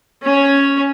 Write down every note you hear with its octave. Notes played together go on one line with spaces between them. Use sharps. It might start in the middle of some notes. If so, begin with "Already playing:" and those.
C#4 C#5